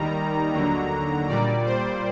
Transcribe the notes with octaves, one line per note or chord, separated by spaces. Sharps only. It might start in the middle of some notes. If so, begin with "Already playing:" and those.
Already playing: D#2 D#3 G3 A#5
D#2 D3 F#3
A#2 G3 D5
C5